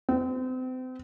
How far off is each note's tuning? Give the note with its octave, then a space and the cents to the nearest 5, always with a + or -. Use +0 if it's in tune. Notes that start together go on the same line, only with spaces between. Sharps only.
C4 -35